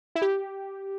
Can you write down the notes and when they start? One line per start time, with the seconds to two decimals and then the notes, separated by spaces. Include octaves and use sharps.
0.15 E4
0.22 G4